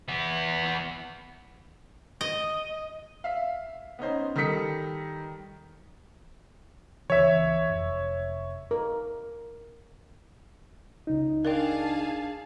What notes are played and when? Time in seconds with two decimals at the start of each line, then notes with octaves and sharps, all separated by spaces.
0.08 E3 B3
2.21 D#5
3.24 E5 F5
3.99 B3 C#4 D#4 C5
4.36 D#3 G3 A4 D#6 B6 C#7
7.10 C#2 E3 C#5 E5
7.69 F1
8.71 A#4
11.07 C#2 D#4
11.45 D4 G#4 A#4 D5 F5 G5 A5